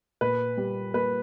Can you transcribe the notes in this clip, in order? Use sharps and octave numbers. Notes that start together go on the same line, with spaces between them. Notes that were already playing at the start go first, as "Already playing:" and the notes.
A#2 B4
G3
A#3 B4